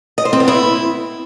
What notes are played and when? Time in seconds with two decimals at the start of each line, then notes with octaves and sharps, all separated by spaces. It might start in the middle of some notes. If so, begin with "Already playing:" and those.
0.18 D#5
0.25 C5
0.33 C4
0.40 B3
0.48 E4